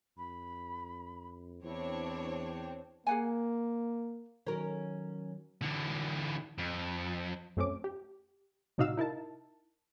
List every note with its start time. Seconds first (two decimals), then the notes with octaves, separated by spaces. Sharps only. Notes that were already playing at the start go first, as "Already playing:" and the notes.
0.17 F2 B5
1.63 E2 C4 D4 E4 C#5
2.48 G5
3.07 A#3 G#4 F#5 G#5
4.47 D#3 F#3 C#4 A#4
5.62 D3 E3
6.58 F2
7.57 F#2 A3 C4 C#4 D6
7.84 G4
8.78 A2 C3 D#4 F#4 F5 E6
8.97 D#4 E4 A#4 A5